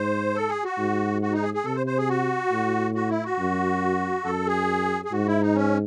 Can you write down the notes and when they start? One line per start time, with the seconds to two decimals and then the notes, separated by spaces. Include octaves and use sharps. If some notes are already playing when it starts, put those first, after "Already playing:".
Already playing: G#2 C5
0.35 A4
0.49 G#4
0.64 F#4
0.78 G#2
1.22 F#4
1.33 D#4
1.43 G#4
1.54 G#4
1.65 C3 A4
1.76 C5
1.86 C5
1.98 G#4
2.08 F#4
2.52 A2
2.95 F#4
3.09 E4
3.24 F#4
3.38 F#2
4.25 F#2 A4
4.47 G#4
5.05 G#4
5.12 G#2 F#4
5.27 E4
5.41 D#4
5.55 C#4